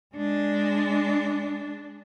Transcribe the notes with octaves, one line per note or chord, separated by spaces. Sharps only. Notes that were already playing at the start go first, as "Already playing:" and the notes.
G#3 D4